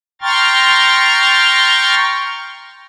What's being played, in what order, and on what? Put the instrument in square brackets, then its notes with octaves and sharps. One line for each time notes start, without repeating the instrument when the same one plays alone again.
[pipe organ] G5 A#5 C6 C#6 F6 A6